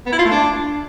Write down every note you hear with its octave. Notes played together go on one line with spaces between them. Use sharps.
B3
E4
F4
A3
D4